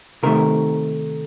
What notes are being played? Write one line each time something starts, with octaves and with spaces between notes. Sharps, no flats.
C3 D#3 A3 A#4